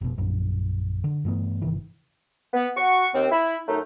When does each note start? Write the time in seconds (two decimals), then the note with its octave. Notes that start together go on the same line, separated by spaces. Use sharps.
0.01 F1 B2
0.18 A#1 F#2
1.04 D3
1.25 G2 E3 A3 B3
1.61 G1 C3 D#3 E3
2.53 B3
2.77 F#4 C#6
3.14 D#2 C4
3.32 E4
3.68 F#2 A3 D#4